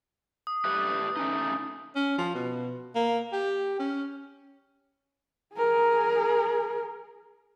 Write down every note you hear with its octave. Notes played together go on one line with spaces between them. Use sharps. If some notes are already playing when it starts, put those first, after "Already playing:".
D#6
A3 G4 B4
A3 C#4 D#4
C#4
F3
B2
A#3
G4
C#4
G#4 A#4